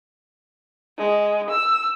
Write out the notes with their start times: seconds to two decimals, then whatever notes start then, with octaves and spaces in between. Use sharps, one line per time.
0.99 G#3
1.50 E6